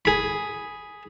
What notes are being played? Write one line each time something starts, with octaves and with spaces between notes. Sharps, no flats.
G#4 B5